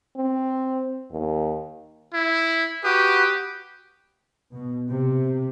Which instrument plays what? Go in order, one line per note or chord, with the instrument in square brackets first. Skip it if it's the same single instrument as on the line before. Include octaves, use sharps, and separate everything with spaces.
[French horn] C4
D#2
[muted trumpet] E4
[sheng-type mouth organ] F#4 B4 D#6 [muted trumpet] G4
[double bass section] B2
C3